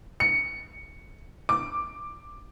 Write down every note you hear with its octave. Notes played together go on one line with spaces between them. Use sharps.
C#7
D6